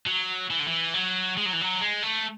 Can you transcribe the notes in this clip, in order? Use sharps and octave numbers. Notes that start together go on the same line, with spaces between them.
F#3
E3
D3
E3
F#3
G#3
F#3
E3
F#3
G#3
A3